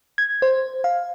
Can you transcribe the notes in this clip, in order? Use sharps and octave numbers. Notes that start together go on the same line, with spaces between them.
G#6
C5
F5